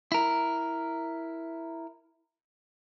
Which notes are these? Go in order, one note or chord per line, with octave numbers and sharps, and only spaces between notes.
E4 A#4